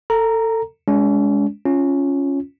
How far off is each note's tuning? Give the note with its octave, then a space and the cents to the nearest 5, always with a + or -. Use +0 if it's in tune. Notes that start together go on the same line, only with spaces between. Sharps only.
A4 +25 A#5 +0
G#3 +0 C#4 +45
C#4 +0 F4 -5